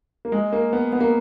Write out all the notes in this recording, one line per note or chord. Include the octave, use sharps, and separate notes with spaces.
A#3
G#3
A#3
B3
B3
A#3